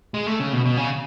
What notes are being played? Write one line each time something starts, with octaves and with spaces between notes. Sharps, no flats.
G#3
A3
C#3
B2
B2
C#3